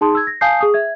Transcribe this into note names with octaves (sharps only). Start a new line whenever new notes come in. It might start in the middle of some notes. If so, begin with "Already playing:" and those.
D#4 G#4 A5 C6 D#6
E6 G#6
A#6
F5 G#5 A5 D#6 G6 C7
G#4 D#6
E5 G#6